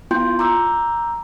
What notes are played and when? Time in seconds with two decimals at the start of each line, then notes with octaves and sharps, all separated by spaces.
0.11 B3 E4 F4 G5 C6 G6
0.39 A#5 D6 E6 G6